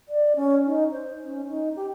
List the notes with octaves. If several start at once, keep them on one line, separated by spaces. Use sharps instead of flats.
D5
C#4
D#4
C5
C#4
D#4
G4